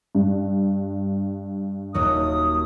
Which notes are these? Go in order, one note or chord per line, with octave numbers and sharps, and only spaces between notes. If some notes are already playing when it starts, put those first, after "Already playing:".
G2
D#1 D#2 F#3 D#6